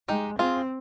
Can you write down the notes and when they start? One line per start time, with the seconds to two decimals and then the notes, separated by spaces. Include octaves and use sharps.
0.08 G#3 D#4 G4
0.39 C4 F4 G#4